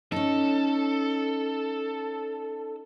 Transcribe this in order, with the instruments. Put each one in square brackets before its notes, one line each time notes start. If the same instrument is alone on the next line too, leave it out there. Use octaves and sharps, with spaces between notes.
[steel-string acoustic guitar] C#4 D#4 [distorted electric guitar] A4